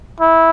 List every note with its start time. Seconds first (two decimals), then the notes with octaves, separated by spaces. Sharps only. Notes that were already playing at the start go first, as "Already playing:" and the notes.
0.21 E4